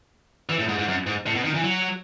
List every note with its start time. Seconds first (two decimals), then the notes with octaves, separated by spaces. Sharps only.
0.49 E3
0.59 A2
0.69 G#2
0.79 G#2
0.88 F#2
1.07 G#2
1.26 A2
1.35 B2
1.45 D#3
1.55 E3
1.64 F#3